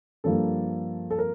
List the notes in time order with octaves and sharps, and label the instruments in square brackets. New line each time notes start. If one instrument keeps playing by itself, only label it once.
[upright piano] G2 F3 A#3 A4
A4
A#4